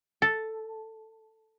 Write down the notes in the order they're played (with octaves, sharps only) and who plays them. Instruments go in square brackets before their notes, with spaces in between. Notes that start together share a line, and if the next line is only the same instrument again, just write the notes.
[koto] A4